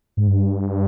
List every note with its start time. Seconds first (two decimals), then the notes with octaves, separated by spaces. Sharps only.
0.17 G#2
0.27 G2